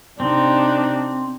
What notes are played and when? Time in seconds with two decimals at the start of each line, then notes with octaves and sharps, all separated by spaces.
0.20 C3 C4 D4 D#4